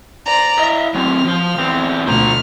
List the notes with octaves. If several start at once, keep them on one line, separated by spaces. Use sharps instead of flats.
C5 D5 A#5
E4 D#5 E5
F#3 C4 F6
F3 C5
E2 C4
D2 B2 F4 C5 A#5 F6